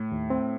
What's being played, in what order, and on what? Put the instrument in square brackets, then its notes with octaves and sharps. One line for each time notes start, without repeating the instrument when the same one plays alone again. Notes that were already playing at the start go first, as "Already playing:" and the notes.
Already playing: [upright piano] A2
[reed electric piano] D#2
C4